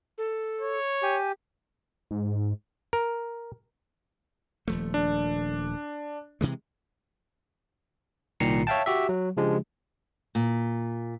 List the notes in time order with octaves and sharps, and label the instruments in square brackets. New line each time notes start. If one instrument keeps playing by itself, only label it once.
[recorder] A4
[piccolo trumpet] C#5
[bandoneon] G4 [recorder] G#5
[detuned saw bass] G#2
[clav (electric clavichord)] A#4
[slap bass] D#1 F3 A3
[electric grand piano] D4
[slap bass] C3 E3 G#3
[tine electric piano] C2 A#2 D#3 A#5 C7 C#7
C#5 E5 F5 G5 A5
F#4 G4 E5
F#3
C#3 F3 G#3 D4 G4
[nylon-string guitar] A#2